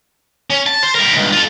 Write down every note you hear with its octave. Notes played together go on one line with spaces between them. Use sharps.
C#4
A5
C5
G3 A#4
C#2 G2
F4 A4